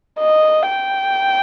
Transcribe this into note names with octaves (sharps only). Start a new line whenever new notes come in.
D#5
G5